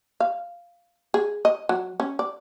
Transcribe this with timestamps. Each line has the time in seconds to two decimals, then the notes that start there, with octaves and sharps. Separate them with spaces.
0.20 F5
1.14 G#4
1.45 D#5
1.69 F#3
2.00 C#4
2.19 D5